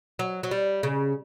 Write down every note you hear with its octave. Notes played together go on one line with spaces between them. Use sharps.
F#3
F#3
G3
C#3